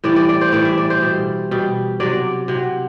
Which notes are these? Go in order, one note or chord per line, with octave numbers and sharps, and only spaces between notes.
A2 E3 G3 D5
D5
D5
C5
A2 E3 G3 D5
E5
D5
C5
B2 G3
B2 G3
C3 F#3 D5
C3 F#3